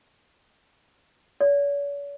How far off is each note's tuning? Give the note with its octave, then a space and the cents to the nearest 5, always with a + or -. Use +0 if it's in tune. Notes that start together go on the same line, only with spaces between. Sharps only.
C#5 +45